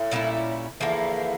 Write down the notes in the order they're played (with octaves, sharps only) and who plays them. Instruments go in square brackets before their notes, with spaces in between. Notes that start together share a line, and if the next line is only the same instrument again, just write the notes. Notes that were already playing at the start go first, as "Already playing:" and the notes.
Already playing: [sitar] A2
[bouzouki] A#2 G3 C#4 E4
[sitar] E2 [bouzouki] D3 F3 A#3 E4